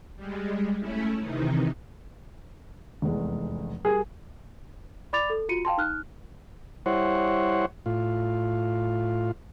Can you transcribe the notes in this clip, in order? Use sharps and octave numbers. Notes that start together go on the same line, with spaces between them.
G3 G#3
A3 C#4 E4
C3 D#3 E3 D#4
F1 E2 G#3
G3 G#4 A#4
D5 B5 D6 A6 F7
A4
F4 F#4 C#7 D#7
F5 G5 A5 C6
D#4 F6 F#6
G3 E4 C5 C#5 F#5
A2 F4